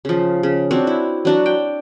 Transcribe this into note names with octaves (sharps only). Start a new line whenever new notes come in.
C#3 F3
C#3
C4 D4 F#4 C#5
E4
F#3 D4 F#4
G5